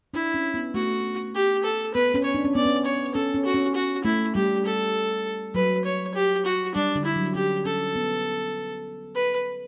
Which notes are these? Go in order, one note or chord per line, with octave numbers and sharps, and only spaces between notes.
D4 E4
C#4
B3
A3 F#4
G4
A4
B3 B4
C#4
C#5
D4
C#4
B3 D5
C#4
C#5
C#4 A4
C#4
F#4
C#4
F#4
A3 E4
G3 G4
A4
F#3 B4
C#5
G4
F#4
G3 D4
D3
E4
F#3
C#4 G4
C#4 A4
B3
B4